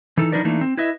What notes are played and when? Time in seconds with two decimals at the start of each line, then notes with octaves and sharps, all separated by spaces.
0.17 E3 D#4 A4
0.32 F3 D4 D#4 A#4 B4 D5
0.45 E3 A3 A#3 D4 D#4
0.61 C4
0.77 E4 B4 D#5 E5